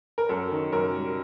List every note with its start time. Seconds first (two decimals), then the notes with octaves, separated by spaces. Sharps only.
0.18 A#4
0.29 F#2 A4
0.51 D#3
0.72 F#2 A#4
0.95 G3